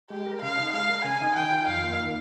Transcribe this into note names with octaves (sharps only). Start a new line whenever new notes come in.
G#3 G4
A#4
C#3 F5
D#4
G#3 F5
A#4
C#3 G#5
D#4
D#3 G5
F4
F2 F5
A#3
D#3